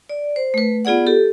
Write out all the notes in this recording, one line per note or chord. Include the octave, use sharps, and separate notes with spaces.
D5
C5
A3 B4
B3 F4 G#4 D5 F#5
G4 A4